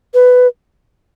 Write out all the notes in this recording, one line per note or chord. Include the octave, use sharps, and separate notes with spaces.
B4